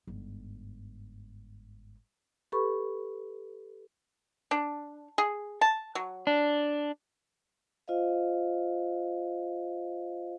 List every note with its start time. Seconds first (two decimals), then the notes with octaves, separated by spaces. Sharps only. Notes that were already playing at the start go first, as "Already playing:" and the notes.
0.07 G1 G#2
2.52 G4 A4 B4 B5 C#6
4.51 D4
5.18 G#4
5.61 A5
5.95 F#3
6.27 D4
7.88 F4 C5 D#5 F5